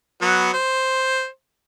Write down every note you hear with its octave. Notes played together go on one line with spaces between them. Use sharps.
F#3 B3
C5